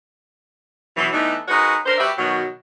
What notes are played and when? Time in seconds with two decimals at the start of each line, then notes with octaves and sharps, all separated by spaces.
0.97 B2 E3 F#3
1.12 E3 A3 B3 D4 D#4
1.48 G#3 D#4 F#4 A#4 B4 C#5
1.86 D4 A#4 C5
1.98 F#4 G4 B4 D5 E5
2.18 B2 D#3 F#3